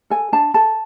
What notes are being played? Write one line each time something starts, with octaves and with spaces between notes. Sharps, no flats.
A4 G#5
D4 A5
A4 A5